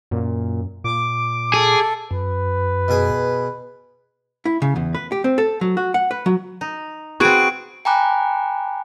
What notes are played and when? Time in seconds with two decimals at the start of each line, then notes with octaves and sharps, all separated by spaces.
0.11 F#2 A#2
0.84 A#2 D6
1.54 G#4 A4
2.11 F#2 B4
2.88 B2 G#4
4.45 E4
4.62 C#3
4.76 E2
4.95 B4
5.12 G4
5.24 C4
5.38 A4
5.61 F#3
5.77 F#4
5.94 F#5
6.11 B4
6.26 F#3
6.61 D#4
7.20 C4 F#4 G#4 B4 C#6 F#6 D7
7.85 G5 G#5 A#5 B5 D6 F#6